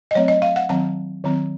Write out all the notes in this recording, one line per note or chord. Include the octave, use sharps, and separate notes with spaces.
D#5
F#3 A3 C4 C#5
D#5
F5
F#5
D#3 F#3 C4 A5
D#3 F#3 C4